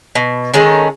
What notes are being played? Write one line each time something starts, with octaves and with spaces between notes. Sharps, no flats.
B2
D#3 G#3 C#4 A4